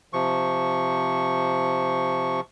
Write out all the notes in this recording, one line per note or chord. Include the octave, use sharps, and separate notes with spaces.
C3 F3 C#6